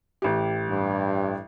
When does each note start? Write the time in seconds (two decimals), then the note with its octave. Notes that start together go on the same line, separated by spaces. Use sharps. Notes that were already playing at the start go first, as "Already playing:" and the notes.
0.22 A1 G4
0.70 G2